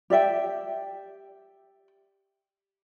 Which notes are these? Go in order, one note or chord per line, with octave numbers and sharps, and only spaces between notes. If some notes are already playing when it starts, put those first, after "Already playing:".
G4 D5 E5 G5